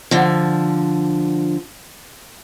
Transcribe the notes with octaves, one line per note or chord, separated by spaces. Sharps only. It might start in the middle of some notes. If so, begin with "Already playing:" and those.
D3 F3